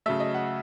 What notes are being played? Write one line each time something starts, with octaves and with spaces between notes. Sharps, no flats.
C#3 F#3 A3 E5
D#5
F#5